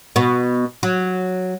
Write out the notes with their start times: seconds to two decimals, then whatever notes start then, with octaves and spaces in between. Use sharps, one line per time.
0.16 B2 B3
0.83 F#3